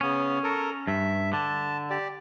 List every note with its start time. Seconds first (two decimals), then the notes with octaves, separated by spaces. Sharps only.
0.01 C#3 B3 C#4
0.44 A4 A#4
0.87 G2 E5
1.33 D3 A5
1.90 G4 D5